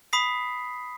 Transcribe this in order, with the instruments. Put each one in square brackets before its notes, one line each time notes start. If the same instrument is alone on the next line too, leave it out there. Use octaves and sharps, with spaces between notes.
[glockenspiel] B5 D#6 B6 C7